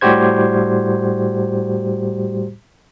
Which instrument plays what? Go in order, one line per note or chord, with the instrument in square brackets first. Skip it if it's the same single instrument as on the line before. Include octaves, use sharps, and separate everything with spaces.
[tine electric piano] A2 G3 F#4 G4 C5 G#6